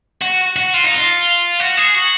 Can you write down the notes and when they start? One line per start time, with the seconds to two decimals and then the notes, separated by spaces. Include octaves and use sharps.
0.21 F#4
0.56 F#4
0.74 F4
0.84 D#4
0.94 F4
1.60 F#4
1.77 G#4
1.95 F#4